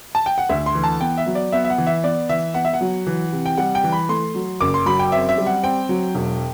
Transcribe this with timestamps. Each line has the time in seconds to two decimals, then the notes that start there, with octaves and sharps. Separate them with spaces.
0.15 A5
0.26 G5
0.38 F#5
0.49 D2 E5
0.66 C6
0.75 E3
0.84 A5
1.01 B3 G5
1.18 E5
1.26 F#3
1.35 D5
1.52 B3 E5
1.64 E5
1.70 F#5
1.78 E3
1.87 E5
2.03 B3 D5
2.29 E3 E5
2.54 B3 F#5
2.65 E5
2.73 F#5
2.81 F#3
3.07 E3
3.32 C3
3.46 G5
3.58 G3 F#5
3.75 G5
3.84 E3
3.92 B5
4.09 A3 C6
4.35 F#3
4.61 F#1 D6
4.74 C6
4.86 F#3 B5
4.99 G5
5.12 C4 E5
5.29 E5
5.38 G3
5.46 F#5
5.63 C4 G5
5.89 F#3
6.15 E1